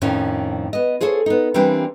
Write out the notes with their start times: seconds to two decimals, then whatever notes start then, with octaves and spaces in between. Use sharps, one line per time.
0.02 F2 A2 D#3 F3 C#4
0.73 B3 D#5
1.01 F4 G#4 A4 C5 C#5
1.26 B3 D#4
1.54 E3 G3 A#3 C4 D4 G4